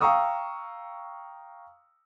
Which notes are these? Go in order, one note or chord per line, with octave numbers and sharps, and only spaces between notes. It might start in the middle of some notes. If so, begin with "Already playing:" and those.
F5 G5 A#5 C#6 D#6 E6